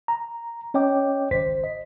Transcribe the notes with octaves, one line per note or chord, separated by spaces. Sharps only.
A#5
C#4 C#5 D#5 G5 D6
G#1 C#2 C5 B6
D#5